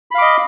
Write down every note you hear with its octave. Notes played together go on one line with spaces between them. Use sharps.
D#5 F5 B5 D6